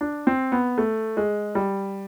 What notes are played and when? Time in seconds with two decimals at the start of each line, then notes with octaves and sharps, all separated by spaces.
0.01 D4
0.27 C4
0.52 B3
0.78 A3
1.17 G#3
1.55 G3